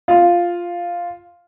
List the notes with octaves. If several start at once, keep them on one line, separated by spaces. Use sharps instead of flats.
F4